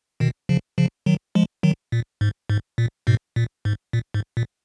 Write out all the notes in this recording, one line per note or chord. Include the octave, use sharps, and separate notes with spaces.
B2 D#3
C#3 F3
C#3 F3
D#3 F#3
F3 G#3
D#3 F#3
A#2
G#2
G#2
A#2
G#2 B2
A#2
G#2
A#2
G#2
A#2